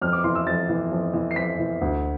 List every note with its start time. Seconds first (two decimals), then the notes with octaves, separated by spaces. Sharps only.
0.01 F2 F6
0.13 D6
0.24 E3 C6
0.35 E6
0.47 F2 A6
0.69 E3
0.92 F2
1.14 E3
1.31 C7
1.36 F2 B6
1.59 E3
1.81 D2